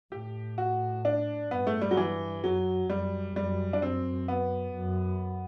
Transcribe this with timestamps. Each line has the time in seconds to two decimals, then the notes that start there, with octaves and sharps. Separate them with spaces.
0.12 A2 G4
0.58 F#4
1.05 D4
1.51 G2 B3
1.67 A3
1.82 G3
1.91 F#3
1.97 E3
2.43 F#2 F#3
2.89 F#2 G3
3.35 F#2 G3
3.73 D4
3.81 F#2 C4
4.28 B3
4.75 F#2